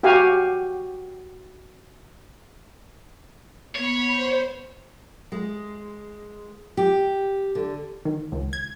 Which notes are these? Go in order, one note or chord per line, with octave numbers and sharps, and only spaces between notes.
F#4 G4 F5 G#5
B3 C#5 B5
C5
G#3
G4
D3
D#3
C#2
G#6